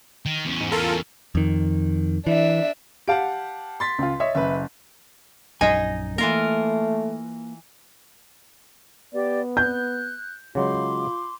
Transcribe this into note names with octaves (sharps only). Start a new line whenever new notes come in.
D#3
E2 C#4
G#2
F4 A4 A#4
F2 D#3
E3 D4 E5
G4 F5 F#5 A5 D7
C6 A6 B6
C#2 F4
C#5 D#5 E5
F#1 B4 E5
A#1 F#2 D#4 D#5 G#5
E3 A3 A#3 F4 A#4
B3 G4 D5
F#6 G6
C#3 F#3 G#3 F4 B5 C6 D6